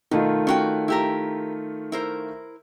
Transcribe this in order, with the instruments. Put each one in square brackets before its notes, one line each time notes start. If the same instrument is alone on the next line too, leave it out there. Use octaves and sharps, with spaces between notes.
[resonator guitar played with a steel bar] B2 [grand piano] D#3 A3 F4
[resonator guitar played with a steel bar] C#4 F#4 G5
E4 G4 A#4
E4 A#4 C5